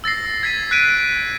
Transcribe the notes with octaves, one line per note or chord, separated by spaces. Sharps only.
E6 A6 A#6 C7
G#6 B6 C7 D#7
F#6 B6 D7 D#7
D7